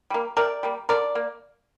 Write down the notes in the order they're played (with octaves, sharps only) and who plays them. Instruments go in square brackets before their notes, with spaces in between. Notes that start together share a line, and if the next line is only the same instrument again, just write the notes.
[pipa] G3 A#3
C3 A#4 D5
G3 A#3
D3 A#4 D5
A#3